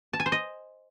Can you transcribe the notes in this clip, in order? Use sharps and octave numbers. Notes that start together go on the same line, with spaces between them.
A5
G#5
C5
D#5